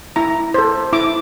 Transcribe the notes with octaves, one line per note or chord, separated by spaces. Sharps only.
E4 A#5
A4 C5
E4 D6